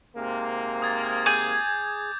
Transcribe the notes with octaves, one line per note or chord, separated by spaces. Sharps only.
G#2 C3 A#3
D#6 G#6 A6
G#4 D6 G6 G#6